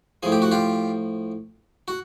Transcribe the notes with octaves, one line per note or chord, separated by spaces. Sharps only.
A2 F3 G#4
G4
F#4
F4 G4
F#4